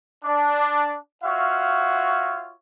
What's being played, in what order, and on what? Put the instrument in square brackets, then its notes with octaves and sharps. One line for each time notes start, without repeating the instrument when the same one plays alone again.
[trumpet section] D4
F4 F#4 C#5 E5 F5